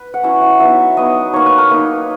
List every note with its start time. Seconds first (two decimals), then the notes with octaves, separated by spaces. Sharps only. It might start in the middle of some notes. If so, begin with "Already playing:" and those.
Already playing: B4
0.14 F#5
0.23 F#3 C#4 E4 E5
0.42 F#5
0.60 F#3 B3 D#4 E5
0.97 F#3 B3 D#4 D#5
1.33 A#3 D#4 C#5
1.46 B4
1.58 A#4
1.71 A#3 D#4 B4